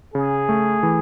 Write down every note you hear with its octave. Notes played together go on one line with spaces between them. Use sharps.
C#3 G#4
A3
E3